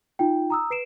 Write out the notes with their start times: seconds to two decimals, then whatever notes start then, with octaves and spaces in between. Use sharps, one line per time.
0.19 D#4 F4 G5
0.50 A#5 D#6 E6
0.70 B4 C7 D7 E7